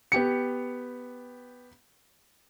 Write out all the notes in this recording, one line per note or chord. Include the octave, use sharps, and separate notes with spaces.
B3 G4 C#7